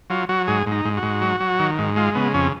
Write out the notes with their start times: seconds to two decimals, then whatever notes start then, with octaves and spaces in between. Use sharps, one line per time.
0.10 F#3 F4
0.29 F#3 F#4
0.47 G#2 G#4
0.67 G#2
0.72 D#4
0.85 G#2
0.97 F#4
1.03 G#2
1.21 F#3
1.40 F#3
1.60 D#3
1.79 G#2
1.96 G#3 F4
2.15 C#3 B3
2.34 F2 C#4